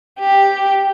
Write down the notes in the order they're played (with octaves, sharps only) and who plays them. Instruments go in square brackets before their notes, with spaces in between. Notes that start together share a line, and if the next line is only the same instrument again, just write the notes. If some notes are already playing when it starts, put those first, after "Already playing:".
[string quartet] G4